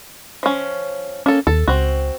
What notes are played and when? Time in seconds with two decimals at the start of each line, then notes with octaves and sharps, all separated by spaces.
0.43 F3 C#4
1.26 A#3 C#4 A4
1.47 D#2 A4
1.68 C#2 C4 F#4